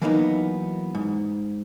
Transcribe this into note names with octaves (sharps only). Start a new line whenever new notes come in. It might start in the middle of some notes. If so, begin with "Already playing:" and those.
E3 F#3 A#3 B3 D4 D#4
G#2